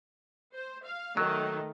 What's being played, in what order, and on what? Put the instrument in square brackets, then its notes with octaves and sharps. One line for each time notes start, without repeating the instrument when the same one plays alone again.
[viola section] C5
F5
[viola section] D#3 A3 [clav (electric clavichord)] F#3